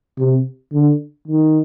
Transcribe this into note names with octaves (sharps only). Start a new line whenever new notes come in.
C3
D3
D#3